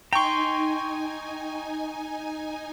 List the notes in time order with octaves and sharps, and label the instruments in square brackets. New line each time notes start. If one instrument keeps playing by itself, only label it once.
[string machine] D#4 G#5 [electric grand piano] G5 C#6 [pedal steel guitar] A#5 C6